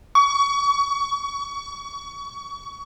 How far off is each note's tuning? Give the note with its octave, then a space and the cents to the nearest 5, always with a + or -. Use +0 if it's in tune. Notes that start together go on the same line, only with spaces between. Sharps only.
C#6 +30